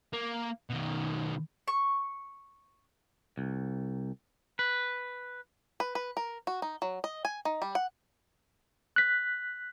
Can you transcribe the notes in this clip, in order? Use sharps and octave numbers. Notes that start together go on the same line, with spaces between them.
A#3
B2 D#3
C#6
C2
B4
B4
B4
A#4
F#4
D#4
F#3
D#5
G#5
D#4
G3
F#5
F#6 B6